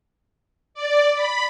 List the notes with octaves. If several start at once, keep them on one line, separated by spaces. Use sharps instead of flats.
D5
B5